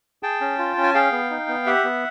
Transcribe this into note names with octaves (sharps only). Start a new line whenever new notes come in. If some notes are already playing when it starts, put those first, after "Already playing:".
G#4 G5 A5
C#4
F4
C#4
G#5
G#4 F5 G5
B3
D#4
B3
G4 E5 F#5
B3